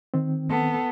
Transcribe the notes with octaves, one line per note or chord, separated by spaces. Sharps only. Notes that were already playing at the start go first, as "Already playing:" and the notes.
D#3 C4
B3 A4